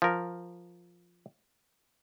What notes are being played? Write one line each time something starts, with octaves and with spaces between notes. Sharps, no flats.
F3 A#4